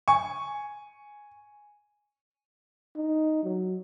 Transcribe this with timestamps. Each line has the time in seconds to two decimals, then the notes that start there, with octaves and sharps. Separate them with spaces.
0.08 G#5 C#6
2.97 D#4
3.43 F#3